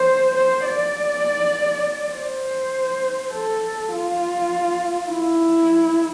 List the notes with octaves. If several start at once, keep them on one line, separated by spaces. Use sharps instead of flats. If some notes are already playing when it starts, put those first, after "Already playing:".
Already playing: C5
C5
D5
C5
A4
F4
E4